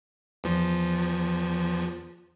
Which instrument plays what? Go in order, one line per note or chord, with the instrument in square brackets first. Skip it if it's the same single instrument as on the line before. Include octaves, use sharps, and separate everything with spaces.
[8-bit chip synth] E2 F3